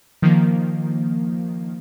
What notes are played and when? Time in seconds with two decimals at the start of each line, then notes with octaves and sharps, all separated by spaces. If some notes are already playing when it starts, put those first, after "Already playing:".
0.22 D#3 F3 A#3